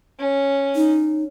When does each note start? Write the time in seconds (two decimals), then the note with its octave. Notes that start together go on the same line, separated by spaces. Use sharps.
0.19 C#4
0.76 D#4